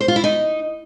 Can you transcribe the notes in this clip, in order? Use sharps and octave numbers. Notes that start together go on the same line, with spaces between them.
C5
F4
E4
D#4